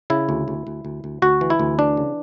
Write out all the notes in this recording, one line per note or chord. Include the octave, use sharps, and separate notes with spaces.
C#3 E4
D2
D2
D2
D2
D2
D2 F#4
E3
E4
D2
E3 D4
C#3